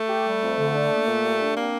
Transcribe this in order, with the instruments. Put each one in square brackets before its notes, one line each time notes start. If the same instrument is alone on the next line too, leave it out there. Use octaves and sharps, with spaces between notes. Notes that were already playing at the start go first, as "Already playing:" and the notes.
Already playing: [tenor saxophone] A3
[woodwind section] G4
G3
F2
D3
D4
A#3
A#2
G3
D4
[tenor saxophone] A#3 [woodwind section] C4